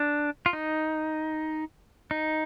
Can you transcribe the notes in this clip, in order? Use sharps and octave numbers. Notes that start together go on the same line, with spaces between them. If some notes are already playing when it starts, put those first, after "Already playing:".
Already playing: D4
F4
D#4
D#4